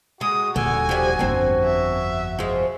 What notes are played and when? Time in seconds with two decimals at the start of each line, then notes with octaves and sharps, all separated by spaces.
0.21 G#3 F#4 D#6
0.56 D#1 D3 G#5
0.89 F3 G3
1.19 G1 F2 C4 D4
1.64 E5
2.39 F3 G#3